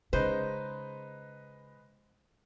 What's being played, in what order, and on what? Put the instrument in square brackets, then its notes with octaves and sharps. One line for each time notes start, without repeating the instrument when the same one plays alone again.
[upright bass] C#3 [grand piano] G#3 D#4 B4 [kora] C5